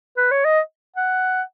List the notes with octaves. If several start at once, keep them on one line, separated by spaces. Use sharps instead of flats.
B4
C#5
D#5
F#5